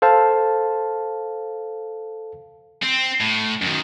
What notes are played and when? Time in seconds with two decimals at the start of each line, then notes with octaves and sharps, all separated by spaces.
0.02 A4 C5 F5 A5
2.83 C4
3.21 A2
3.62 F#2 D#3